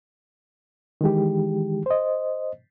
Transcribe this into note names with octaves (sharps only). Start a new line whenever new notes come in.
D#3 E3 G#3 G4
C5 D#5